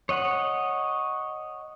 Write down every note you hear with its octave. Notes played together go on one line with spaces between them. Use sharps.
C#5 D#5 F#5